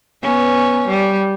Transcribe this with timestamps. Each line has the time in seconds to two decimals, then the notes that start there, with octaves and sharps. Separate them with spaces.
0.23 B3 C#4
0.88 G3